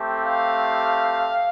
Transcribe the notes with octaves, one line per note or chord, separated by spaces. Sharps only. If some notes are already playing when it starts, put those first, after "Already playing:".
Already playing: A3 C4 G4
F5